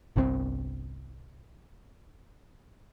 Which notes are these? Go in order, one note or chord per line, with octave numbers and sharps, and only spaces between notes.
G1 C2 C#3 C4